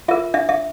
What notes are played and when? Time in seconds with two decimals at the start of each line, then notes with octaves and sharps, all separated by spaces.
0.08 F4 A#4 E5
0.34 D4 E5
0.49 E5